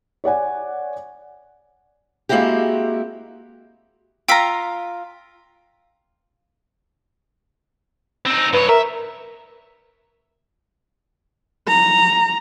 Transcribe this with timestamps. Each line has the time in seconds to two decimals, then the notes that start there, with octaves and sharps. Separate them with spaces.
0.24 C#5 D5 F#5 G#5
2.29 G#3 A#3 C4 E4 F#4 G4
4.28 F4 F5 G5 A#5 E6 B6
8.26 C4 D#4
8.53 G2 B4 C#5
8.69 A#4 E5
11.68 A#5